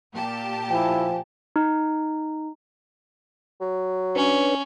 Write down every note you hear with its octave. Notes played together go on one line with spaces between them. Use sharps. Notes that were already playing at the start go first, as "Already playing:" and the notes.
A#2 G4 A5
F3 E4 G5 G#5
D#4
F#3
C#4 D4 B4 C#5